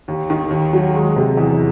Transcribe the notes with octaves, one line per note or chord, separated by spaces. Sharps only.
D#2
D#3
D#2
F#3
G#3
C3
E2